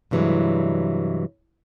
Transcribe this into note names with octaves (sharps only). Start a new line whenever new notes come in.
G2 C3 E3 F#3 G#3